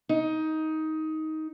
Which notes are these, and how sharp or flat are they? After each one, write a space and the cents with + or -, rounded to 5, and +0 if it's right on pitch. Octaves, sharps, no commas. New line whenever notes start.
D#4 +15